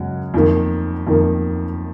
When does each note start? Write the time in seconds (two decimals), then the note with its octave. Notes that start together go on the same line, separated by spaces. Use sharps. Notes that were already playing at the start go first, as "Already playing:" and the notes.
Already playing: F#2 C#3 G#3 F#5
0.34 F2 D#3 A#3
1.07 F2 D#3 A#3